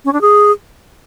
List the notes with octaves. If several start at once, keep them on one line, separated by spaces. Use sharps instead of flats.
C#4
D4
G#4